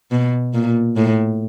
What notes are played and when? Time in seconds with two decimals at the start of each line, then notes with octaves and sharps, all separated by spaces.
0.11 B2
0.54 A#2
0.97 A2